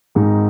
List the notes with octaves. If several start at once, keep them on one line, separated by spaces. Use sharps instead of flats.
G#1 G#2 G#3 D#4